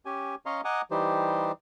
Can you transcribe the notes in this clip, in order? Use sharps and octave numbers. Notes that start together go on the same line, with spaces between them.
C#4 G4 G#5
C#4 C#5 D#5 F5 A#5 C6
D#5 F#5 G#5 A#5 D6 D#6
E3 G3 D#4 G4 C5